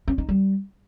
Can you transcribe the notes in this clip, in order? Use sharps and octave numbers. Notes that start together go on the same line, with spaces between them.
C#4
D#4
G3